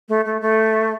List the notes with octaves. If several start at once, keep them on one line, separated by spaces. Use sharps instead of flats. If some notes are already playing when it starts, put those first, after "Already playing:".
A3
A3
A3